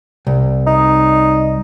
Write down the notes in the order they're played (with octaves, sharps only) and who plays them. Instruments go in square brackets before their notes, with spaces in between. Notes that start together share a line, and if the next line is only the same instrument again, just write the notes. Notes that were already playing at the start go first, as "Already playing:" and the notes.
[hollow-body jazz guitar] C2
[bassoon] D#4